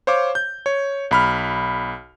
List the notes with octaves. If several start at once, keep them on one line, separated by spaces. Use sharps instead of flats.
C5 C#5 F5 D6
G6
C#5
B1 B5 F6